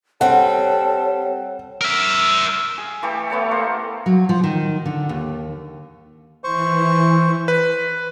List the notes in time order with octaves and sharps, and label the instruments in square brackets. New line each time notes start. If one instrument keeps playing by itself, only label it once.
[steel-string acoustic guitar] G3 C4 [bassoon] A4 [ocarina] C#5 [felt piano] F#5
[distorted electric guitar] A#4 E5
[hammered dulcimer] G#4
E3 A3 G4 A4
A3 B3 A4 C#5
A#3 C5 A#5
[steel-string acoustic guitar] F#3
F3
D#3
D3
D#2
[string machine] E3 [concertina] C5 C#6
[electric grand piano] B4